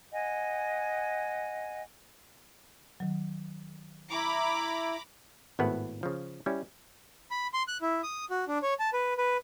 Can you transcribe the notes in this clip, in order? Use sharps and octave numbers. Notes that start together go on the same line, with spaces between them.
D#5 F#5 G#5
D#3 F#3
E4 A#5 B5 D6
G#1 A2 B3 E4 F#5
C#3 F3
G3 C#4 E4
B5
C6
F#6
E4
D#6
F#4
D4
C#5
A5
B4
B4